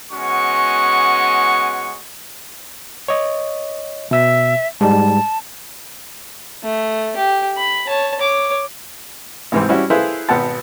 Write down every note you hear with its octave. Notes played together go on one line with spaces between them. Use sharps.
G#3 B3 C#4 F#4 F#5 C#6
C#5 D#5
B2 E5 E6
G#2 G3 G#3 A5
A3
G4
B5
C#5 A5
C#5 D6
C2 G#2 E3 C4
G3 C#4 E4 F#4
E4 G#4 A4 B4 C5 F5
G#1 B2 B3 F#5 G5 A5